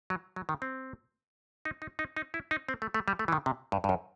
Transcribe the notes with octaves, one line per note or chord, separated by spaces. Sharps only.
F#3
F#3
D#3
C4
D#4
D#4
D#4
D#4
E4
D#4
C4
A3
A3
G3
A3
E3
D#3
C3
G2
G2
F#2